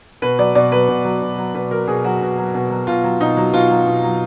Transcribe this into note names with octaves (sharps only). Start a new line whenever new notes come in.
B2 B4
F#3 D5
B2 D5
F#3 B4
B2
F#3
B2
F#3
B2 B4
F#3 A#4
B2 G#4
F#3 F#4
B2
F#3
B2
F#3
B2 F4
F#3
B2 D#4
F#3
B2 F4
F#3
B2
F#3